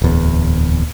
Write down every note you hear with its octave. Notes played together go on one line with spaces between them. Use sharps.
D1 E2